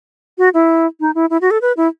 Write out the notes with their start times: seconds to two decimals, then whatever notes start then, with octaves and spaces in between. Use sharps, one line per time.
0.38 F#4
0.54 E4
1.00 D#4
1.15 E4
1.30 E4
1.41 F#4
1.51 A4
1.62 B4
1.77 E4